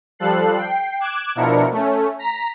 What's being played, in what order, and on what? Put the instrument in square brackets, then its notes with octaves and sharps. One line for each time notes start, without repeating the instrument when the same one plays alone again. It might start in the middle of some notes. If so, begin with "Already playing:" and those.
[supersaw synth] F3 G3 A4 F#6 C7
G5 C7
D6 F#6 G#6 E7
B2 F3 D4 E4 A#4 C#7
A3 C#4
A#5 B6